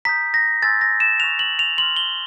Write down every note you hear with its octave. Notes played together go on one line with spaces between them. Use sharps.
A#5 D#6 G6 B6
A#6
G#5 C6 E6 G6 A6
A#6
E7
C#6 F#6 F7
F#7
F7
C6 F6 F#7
G7